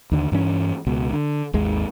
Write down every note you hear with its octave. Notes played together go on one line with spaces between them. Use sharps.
D#2 D3
G2 E3 C#4
C#2 B2
D3
G#1 D#2 G#3